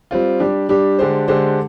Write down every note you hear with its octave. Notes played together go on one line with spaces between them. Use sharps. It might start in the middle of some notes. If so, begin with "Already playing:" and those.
G3 C4 F4
G3 D4 G4
G3 D4 G4
D3 G#3 D4 G4 C5
D3 G#3 D4 G4 C5